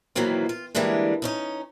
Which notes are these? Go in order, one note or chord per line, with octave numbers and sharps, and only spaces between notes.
B2 D#3 E3 F#3 A#3 C4
F4
D3 E3 G3 G#3 A#3 D4
B3 C#4 D#4